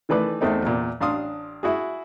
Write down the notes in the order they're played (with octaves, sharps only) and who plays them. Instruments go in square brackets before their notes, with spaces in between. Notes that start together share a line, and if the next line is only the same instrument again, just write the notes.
[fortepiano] D#3 E3 A3 B4 D5
E2 A3 C4 D#4
E2 A#2
A1 D4 F5 C6 D#6
E4 F#4 G#4